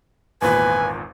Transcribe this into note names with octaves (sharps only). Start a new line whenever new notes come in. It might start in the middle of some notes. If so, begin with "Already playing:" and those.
G#1 E2 A#2 B4 G#5